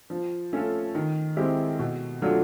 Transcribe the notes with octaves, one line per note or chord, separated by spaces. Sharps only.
F3
A3 C#4 F4 A4
D#3
G#3 C4 E4 G4
B2
F#3 A3 D4 F4